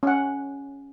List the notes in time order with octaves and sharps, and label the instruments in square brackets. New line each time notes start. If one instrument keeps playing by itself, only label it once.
[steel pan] C#4 F#5